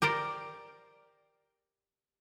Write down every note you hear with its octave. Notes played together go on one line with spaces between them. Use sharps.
G4 A#4 C5 D5